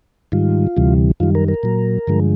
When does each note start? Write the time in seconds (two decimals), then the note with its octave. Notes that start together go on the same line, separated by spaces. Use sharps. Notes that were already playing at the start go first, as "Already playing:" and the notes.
0.32 G#2 D#3 G3 F4
0.77 D2 C3 E3 G3
1.20 F#2 D#3 G3 F4
1.35 A#4
1.48 A#4
1.63 A#2 F#3
2.07 G2 D3 F3 G#3